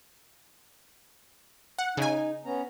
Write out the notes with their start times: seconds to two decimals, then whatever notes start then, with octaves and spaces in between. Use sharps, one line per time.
1.79 F#5
1.97 C#3 D#4 G#5
2.45 B3 C#4 A#5